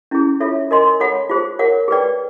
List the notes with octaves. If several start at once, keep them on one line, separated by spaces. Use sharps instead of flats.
C#4 E4 G#4
F4 A4 C#5 E5
A#4 D#5 G#5 C6
A4 C#5 F#5 B5
F4 G#4 C5
A#4 C#5 F#5
G#4 B4 D5 G5